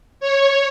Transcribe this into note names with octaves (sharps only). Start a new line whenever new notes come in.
C#5